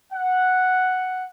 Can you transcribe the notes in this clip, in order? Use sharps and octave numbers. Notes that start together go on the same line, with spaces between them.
F#5